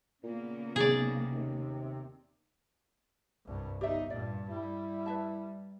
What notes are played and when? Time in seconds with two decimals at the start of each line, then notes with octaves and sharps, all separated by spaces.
0.23 A#2 C#3 A#3 B3
0.76 B1 C3 G#4 D5
1.32 D#2
3.46 C2 G2
3.81 G1 D#4 G4 D5 E5
4.10 G2 A#2 D5
4.50 G3 E4
5.06 B4 E5 A5